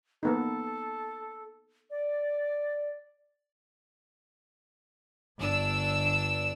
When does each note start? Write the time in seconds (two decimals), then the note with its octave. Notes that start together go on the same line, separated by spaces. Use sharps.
0.23 A#3 B3 D#4 A4
1.90 D5
5.39 G1 D4 E6